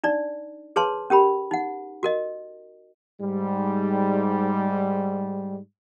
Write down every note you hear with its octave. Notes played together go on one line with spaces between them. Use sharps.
D4 D#4 D5
G#4 B4 C#5 A5 C6
C#4 G4 A#4 B5
D#4 F#5
F#4 A#4 D#5
G#2 G3